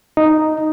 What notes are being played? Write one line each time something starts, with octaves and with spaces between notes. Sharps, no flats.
D#4